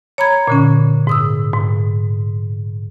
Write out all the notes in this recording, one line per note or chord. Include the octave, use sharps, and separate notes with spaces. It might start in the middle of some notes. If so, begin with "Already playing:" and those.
C#5 A#5 B5 G#6
A#2 D3 C#4
G#2 D#6 E6
G#2